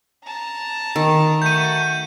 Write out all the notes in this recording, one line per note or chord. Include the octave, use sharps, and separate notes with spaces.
A5 A#5
D#3
A3 F#4 G6 D#7